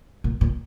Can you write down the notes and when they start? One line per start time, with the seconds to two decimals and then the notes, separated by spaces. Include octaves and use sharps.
0.24 A#2
0.41 A#2